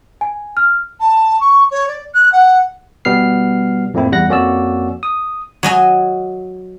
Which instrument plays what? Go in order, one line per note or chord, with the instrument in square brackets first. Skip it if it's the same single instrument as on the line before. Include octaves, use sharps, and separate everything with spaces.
[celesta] G#5
F6
[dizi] A5
C#6
C#5
D5
F#6
F#5
[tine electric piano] B2 G3 B3 F6 C7
F2 A2 A#3 C4 E4
E2 G3 F#5 F#6 A#6
F2 A#3 C#4 F#4 D5 E6
D#6
[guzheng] F#3 D#5 G#5